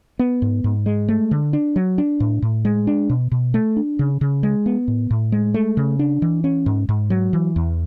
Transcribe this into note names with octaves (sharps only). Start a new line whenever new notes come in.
B3
G#2
G#2
G#3
A3
D3
D4
F#3
D4
A2
A2
G#3
D4
B2
B2
A3
D4
C#3
C#3
G#3
B3
A2
A2
G#3
A3
C#3
D4
E3
C#4
G#2
G#2
F#3
E3
E2